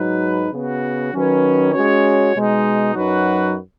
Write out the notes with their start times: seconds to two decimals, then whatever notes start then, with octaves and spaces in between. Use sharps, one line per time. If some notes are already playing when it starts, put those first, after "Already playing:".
Already playing: G#2 F#3 D#4 B4
0.51 C#3 B3 F#4
1.12 D#3 F#3 C#4 B4
1.73 G#3 C#4 F#4 C#5
2.34 B2 G#3 D#4
2.95 F#2 F#3 D#4 F#4 B4